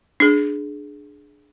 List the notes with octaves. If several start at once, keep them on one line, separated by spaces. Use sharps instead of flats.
D4 G#4